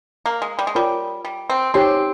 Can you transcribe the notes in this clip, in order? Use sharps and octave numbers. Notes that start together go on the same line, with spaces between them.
A#3
G#3
G3
G#3
G3 F4 A#4 C#5
G3
C4
C4 D#4 G4 C#5 G#5 C6